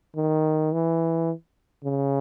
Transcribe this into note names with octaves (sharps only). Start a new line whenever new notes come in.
D#3
E3
C#3